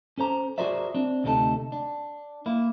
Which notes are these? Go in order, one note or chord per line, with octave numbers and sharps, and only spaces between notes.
C#4 A4 C5 A#5
F#4 G#4 A#4 C5 D5 E5
C4 D4
D2 C3 A3 D#4 A4
D4
A#3 E4